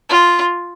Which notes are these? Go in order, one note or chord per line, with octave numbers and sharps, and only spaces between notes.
F4